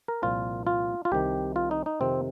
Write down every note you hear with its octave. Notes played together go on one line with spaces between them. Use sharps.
A#4
C2 A#2 F3 F4
F4
F4
C2 C3 D#3 G4
F4
D#4
D#4
F2 C3 D#3 C4